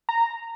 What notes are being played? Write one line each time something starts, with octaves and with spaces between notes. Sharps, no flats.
A#5